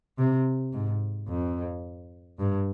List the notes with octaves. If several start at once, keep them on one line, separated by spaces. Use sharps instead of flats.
C3
G#2
F2
G2